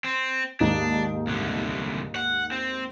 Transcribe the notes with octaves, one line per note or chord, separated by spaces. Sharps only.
C4
D#2 G#2 D4 D#4
C2 D3
F#5
C4